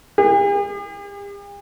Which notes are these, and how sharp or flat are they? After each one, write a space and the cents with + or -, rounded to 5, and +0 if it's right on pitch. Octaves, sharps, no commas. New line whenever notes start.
G4 +45